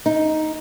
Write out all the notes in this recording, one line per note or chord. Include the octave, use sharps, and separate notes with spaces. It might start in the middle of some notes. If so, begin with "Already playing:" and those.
D#4